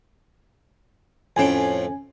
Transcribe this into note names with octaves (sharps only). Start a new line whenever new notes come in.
F2 A2 C#4 G5 G#5